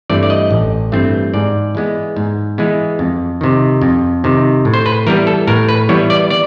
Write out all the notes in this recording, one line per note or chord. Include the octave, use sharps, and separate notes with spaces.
G2 E3 A3 C4 D5
D5
D#5
A1
G2 E3 A3 C4
G#2 D5
E3 G#3 B3
G#2
E3 G#3 B3
F2
C3 D#3
F2
C3 D#3
A2
C5
B4
E3 G3 B3 A#4
A4
A2 A#4
B4
E3 G3 B3 C#5
D5
D5